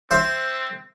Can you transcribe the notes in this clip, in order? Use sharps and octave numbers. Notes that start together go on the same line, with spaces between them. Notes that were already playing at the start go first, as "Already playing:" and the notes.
C4 C5 E5 C6